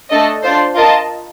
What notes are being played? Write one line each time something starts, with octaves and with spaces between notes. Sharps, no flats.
A3 D4 A4 D#5
D4 F4 C5
F4 A#4 D#5 A5